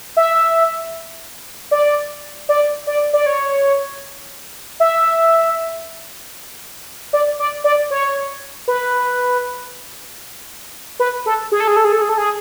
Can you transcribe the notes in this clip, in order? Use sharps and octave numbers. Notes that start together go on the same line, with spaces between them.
E5
D5
D5
D5
D5
C#5
E5
D5
D5
D5
C#5
B4
B4
A4
G#4
A4
G#4
A4
G#4
A4
G#4
A4
G#4